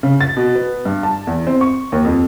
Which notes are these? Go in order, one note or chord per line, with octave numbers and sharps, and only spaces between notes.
C#3
A6
B2
B3
G2
A5
E2
C4
C#6
D#2
F2